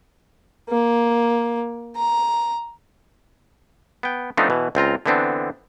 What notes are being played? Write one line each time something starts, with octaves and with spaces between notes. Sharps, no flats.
A#3
A#5
B3 G5
F3 A3 B3 C4 D4 D#4
B2 E3
C#2 C4 F4 A#5
D3 E3 B3 C4 D4